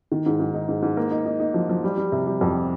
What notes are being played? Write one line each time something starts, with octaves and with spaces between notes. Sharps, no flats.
D#3
G#2
G#2
D#4
G#2
G#2
A#3
D#4
D#4
D#4
F3
F3
G3
G3
C3
G3
F2